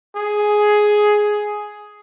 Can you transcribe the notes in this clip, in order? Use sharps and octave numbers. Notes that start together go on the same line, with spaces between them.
G#4